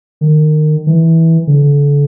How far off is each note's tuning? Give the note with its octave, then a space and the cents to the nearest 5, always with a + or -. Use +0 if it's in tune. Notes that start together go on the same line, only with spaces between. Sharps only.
D#3 -25
E3 -15
D3 -35